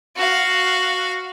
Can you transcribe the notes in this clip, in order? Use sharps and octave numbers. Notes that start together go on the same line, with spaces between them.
F#4 F5